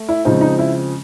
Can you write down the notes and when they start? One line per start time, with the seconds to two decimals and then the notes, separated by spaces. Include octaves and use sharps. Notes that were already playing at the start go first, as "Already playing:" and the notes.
Already playing: A3
0.09 E4
0.25 C#3 F3 G#3 C4 D#4
0.41 D#4
0.59 E4